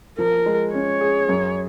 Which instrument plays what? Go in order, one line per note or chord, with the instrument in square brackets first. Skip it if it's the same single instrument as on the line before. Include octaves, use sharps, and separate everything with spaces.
[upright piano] F3 [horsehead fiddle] A#4
[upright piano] G#3
[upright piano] C#4 [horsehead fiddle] C#5
[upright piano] G#4
F#2